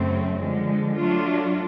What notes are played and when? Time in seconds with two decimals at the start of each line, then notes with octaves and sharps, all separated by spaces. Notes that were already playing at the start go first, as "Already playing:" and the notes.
Already playing: F#2 C#3 F#3 A3 C4
0.38 D3 F3 G#3
0.98 F#3 A3 D4 F4